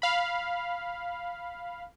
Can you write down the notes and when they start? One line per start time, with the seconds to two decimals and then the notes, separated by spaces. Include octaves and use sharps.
0.02 F5 B5